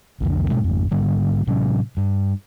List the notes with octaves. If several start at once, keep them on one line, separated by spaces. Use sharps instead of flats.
C2 F2 D3
G#2 B2 D#3 G#3
G#1 F2
G#2 D3 G3
A2 C3 F#3 C#4
G2